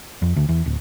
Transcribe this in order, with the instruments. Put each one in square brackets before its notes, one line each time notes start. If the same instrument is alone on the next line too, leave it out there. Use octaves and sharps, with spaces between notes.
[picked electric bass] F2
D2
E2
D1